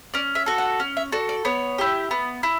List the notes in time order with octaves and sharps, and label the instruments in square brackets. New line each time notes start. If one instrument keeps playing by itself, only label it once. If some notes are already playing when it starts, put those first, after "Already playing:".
[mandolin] C#4 D5
E5
F#4 A4
F#5
C#4
E5
F#4 A4 D5
D5
B3 C#5
E4 G4
B3
E4